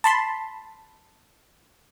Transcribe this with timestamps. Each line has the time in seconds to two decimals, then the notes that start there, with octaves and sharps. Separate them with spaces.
0.04 A5 B5 C6